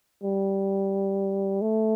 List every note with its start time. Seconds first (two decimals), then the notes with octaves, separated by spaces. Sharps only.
0.23 G3
1.61 A3